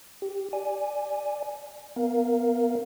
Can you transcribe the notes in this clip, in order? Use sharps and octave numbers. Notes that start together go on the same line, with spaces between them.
G4
D5 G#5
B3 A#4 F5